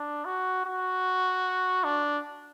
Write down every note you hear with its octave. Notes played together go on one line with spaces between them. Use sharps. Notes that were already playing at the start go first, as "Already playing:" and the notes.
Already playing: D4
F#4
F#4
D4